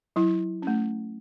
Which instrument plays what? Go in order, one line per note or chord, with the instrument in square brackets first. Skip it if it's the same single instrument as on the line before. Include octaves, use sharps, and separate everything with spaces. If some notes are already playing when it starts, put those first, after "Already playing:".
[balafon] F#3 E4
A3 C#4